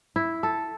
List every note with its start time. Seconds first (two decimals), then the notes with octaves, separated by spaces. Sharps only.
0.16 E4
0.43 A4